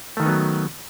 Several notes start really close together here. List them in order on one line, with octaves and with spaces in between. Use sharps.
A3 D#3 D#4 B3 F#3